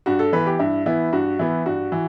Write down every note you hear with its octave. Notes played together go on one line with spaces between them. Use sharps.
G2 F#4
A4
E3 B3 B4
G4
G2 E4
E3 B3 E4
G2 F#4
E3 B3 E4
G2 F#4
E3